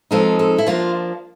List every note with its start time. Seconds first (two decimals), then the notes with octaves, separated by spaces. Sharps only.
0.11 F3 G#3 C4 D#4 A4
0.39 A4
0.58 E4
0.67 F3 A#3 D4 F4